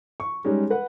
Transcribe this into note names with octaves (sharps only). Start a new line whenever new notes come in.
C#6
G3 G#3 C#4 D#4
B4 F#5